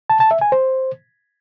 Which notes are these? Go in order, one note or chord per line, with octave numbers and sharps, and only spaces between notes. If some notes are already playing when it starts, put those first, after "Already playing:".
A5
A5
E5
G#5
C5